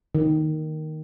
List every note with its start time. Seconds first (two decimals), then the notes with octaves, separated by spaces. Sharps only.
0.15 D#3